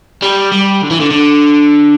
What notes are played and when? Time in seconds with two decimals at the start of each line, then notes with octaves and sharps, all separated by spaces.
0.22 G3
0.52 G3
0.82 D3
0.91 E3
1.00 D3
1.11 D3